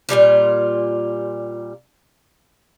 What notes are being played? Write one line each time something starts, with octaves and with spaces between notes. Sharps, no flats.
A#2 C#3 G3 F4